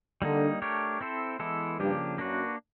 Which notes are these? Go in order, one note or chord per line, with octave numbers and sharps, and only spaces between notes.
D3 G3 A#3 D#4
A3 D4 G4 A#4 C#5
C4 E4 A4 C5
E3 G#3 B3 E4 A4
G2 C#3 F3 A#3 D4 G4
F#2 A#3 D4 F#4 B4